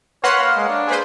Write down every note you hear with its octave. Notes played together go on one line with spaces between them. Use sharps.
A#3 B4 C#5 F5 F#5 A#5 C6
G#3
D4
G#4 B4 C5